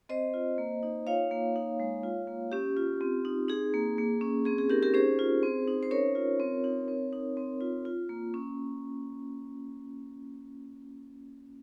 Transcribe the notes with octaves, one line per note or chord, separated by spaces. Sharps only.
C4 C5 D#5
F4
A#3
D#4
F4 C#5 F5
A#3
D#4
G#3
F4
A#3
C#4 G4
F4
C4
D#4
D#4 G#4
A#3
A#3
C#4
C4 G#4
G#4
D#4 G4 A#4
G4 A#4
C#4 G#4 C5
F4
C4
D#4
C5
C#4 A#4 C#5
F4
C4
D#4
C4
D#4
C4
F4
F4
A#3
C#4